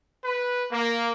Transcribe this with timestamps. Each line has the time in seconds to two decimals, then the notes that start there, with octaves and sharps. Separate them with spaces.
0.24 B4
0.70 A#3